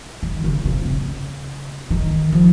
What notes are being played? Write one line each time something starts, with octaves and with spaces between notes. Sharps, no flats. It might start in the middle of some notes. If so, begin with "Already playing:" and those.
D#3
C#3
C3
C#3
D#3
F3